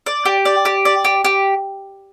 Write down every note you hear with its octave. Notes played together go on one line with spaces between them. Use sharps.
D5
G4
D5
G4
D5
G4
G4